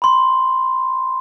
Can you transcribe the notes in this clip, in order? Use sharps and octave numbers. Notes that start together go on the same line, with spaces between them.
B5 C6